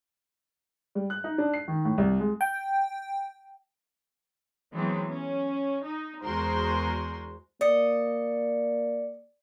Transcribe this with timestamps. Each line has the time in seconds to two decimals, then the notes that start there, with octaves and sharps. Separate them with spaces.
0.95 G3
1.10 F#6
1.24 D#4
1.38 D4
1.54 C7
1.68 D#3
1.85 A2
1.98 C2
2.20 G#3
2.41 G5
4.73 E3 F#3 G#3 B3 C4
5.09 C#4
5.82 D#4
6.23 E2 G#3 F#4 A#4 C5 C6
7.61 A#3 D5 D#5 C#7